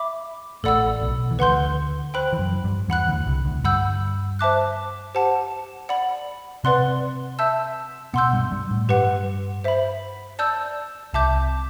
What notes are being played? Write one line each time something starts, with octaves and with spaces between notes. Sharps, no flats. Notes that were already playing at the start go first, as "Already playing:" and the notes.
Already playing: E5 B5 D6
A1 A2 A4 D5 F#5 B5 E6
B1 B2
E3
D2 D3 B4 F#5 C6 G6
C5 G5 B5 F#6
E3
F#2 F#3
G2 G3
E2 E3 F#5 B5 F#6
D2 D3
C2 C3
D2 D3
G2 G3 F#5 B5 E6 G6
C5 E5 A5 D6 F#6
G4 C5 F#5 A5
D5 F#5 B5
C3 C4 B4 D5 F#5 C6 F#6
E5 A5 E6 G6
B2 B3 F#5 C6 E6 G6
G2 G3
G2 G3
A2 A3
G2 G3 G4 B4 F#5
C5 E5 B5
D5 A5 E6 G6
C2 C3 E5 A5 D6 G6